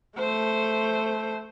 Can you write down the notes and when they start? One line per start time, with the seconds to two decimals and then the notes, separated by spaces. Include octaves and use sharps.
0.18 A3 C5